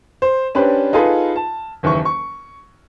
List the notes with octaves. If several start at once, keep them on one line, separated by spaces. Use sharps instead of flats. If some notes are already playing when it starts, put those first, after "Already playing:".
C5
C#4 D4 G4 B4 C5 D5
D#4 F4 G#4 A4 B4
A5
F#1 D#2 E3 C#6
C#6